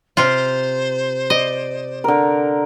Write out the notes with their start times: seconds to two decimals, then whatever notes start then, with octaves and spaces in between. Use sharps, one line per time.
0.17 C3 F4 C5
1.30 D5 D#5
2.04 D3 A#4